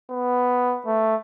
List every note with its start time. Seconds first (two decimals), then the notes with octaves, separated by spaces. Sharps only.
0.11 B3
0.86 A3